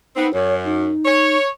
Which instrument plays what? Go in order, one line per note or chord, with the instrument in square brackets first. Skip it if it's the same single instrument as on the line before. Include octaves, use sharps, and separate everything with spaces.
[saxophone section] B3 C4 [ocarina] D#4
[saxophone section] F#2 [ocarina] C#5
[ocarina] D#4
[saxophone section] C#5